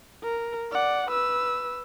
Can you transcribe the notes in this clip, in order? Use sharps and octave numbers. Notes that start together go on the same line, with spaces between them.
A#4
D5 F#5
B4 E6